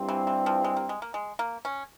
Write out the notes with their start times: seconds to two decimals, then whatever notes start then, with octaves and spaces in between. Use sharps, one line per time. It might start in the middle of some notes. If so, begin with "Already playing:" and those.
Already playing: G2 G3 C4 E4
0.08 E3
0.27 E3
0.46 F3
0.64 G#3
0.77 A#3
0.89 G#3
1.02 A#3
1.14 G#3
1.39 A#3
1.65 C#4